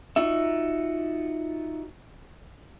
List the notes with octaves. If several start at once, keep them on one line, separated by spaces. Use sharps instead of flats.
D#4 F4 F#4 E5